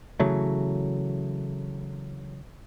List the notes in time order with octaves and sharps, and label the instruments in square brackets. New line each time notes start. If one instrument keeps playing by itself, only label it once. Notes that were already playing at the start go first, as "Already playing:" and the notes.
[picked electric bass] C#3 E3 F#3 A3